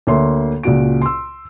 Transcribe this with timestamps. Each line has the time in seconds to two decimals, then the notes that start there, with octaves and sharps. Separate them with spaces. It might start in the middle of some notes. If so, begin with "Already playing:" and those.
0.07 D2 A#3 C#5 E5 C6
0.63 C#2 A#2 F#4 D7
1.02 C6 E6